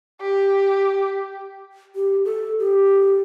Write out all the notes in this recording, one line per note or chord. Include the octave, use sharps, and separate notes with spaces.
G4
G4
A4
G4